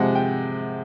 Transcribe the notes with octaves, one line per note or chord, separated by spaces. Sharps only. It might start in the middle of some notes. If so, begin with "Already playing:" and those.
Already playing: C3 F3 G#3 F#5
G5